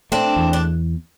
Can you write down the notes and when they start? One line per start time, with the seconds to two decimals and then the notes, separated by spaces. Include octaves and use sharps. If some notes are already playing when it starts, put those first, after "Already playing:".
0.12 A3 C4 D4
0.36 E2
0.53 D4